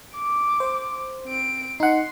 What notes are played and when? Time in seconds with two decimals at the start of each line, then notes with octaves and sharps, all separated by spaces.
0.15 D6
0.60 C5
1.25 C4 D7
1.80 D#4 F#5 C6